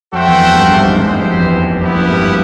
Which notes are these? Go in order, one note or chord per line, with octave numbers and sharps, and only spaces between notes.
F2 F#4 A4 C5 E5 G5
E2
F2
G1 G2
G#1 G#2
G#1 G#2
G1 G2 B3 E4 G4 C5
F#1 F#2
F2
F2
E2
F2 B3 E4 G4
F#1 F#2
G1 G2